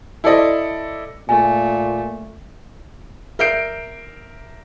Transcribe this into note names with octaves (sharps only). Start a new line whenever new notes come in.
E4 A4 C5 D5 D#5
A#2 A3 G#5
A#4 E5 G6 C7 D7